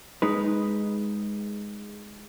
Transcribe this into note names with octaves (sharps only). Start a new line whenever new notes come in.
G#3 D#4 B4